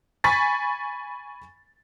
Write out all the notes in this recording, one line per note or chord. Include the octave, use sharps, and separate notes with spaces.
G#5 B5 C#6 A6 B6